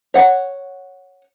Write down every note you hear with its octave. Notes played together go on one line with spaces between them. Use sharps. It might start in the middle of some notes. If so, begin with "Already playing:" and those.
C#5 F#5